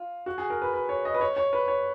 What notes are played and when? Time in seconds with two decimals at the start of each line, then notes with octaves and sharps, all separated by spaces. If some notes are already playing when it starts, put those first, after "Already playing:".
Already playing: F4
0.26 F#4
0.38 G#4
0.50 A#4
0.62 B4
0.74 B4
0.89 C#5
1.05 D#5
1.14 B4
1.21 C#5
1.37 C#5
1.53 B4
1.68 C#5